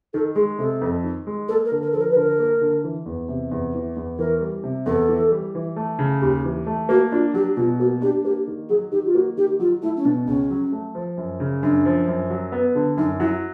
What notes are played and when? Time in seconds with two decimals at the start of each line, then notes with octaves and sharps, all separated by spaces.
0.14 D#3 A4
0.35 G#3 G#4
0.59 C3 A4
0.82 F2
1.04 D#3
1.27 G#3
1.48 A#3 A4
1.65 A#4
1.71 D3
1.82 A#4
1.92 F3 A4
1.99 A#4
2.10 B4
2.16 D3 A#4
2.39 A#3
2.61 D3
2.84 E3
3.06 E2
3.29 C3
3.52 E2
3.75 E3
3.97 E2
4.19 E3 A#4
4.41 G3
4.64 C3
4.86 E2 A4
5.09 E3
5.32 G3
5.55 E3
5.76 A3
5.99 C#3
6.21 D#2 G4
6.45 E3
6.67 A3
6.89 A#3 F#4
7.12 D4 F4
7.34 F#3 G4
7.57 B2 F4
7.80 A#3 F#4
8.02 D4 G4
8.25 A#3 G4
8.47 D#3
8.69 F#3 G#4
8.92 D#3 G4
9.06 F4
9.14 A#3 F#4
9.37 D#3 G4
9.59 F#3 F4
9.82 A3 E4
9.97 C#4
10.05 B2 D4
10.27 C#2 C#4
10.50 F#3
10.72 A3
10.95 F3
11.17 F#2
11.40 C#3
11.63 F#2 D4
11.85 F3
12.08 F#2
12.30 F#3
12.52 B3
12.75 D3
12.97 F#2 D#4
13.20 F#3 E4